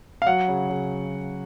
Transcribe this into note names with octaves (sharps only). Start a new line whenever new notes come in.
F5
F#3 F#5
C#3
C#3